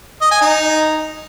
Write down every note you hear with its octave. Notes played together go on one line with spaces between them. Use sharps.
D#5
G#5
D#4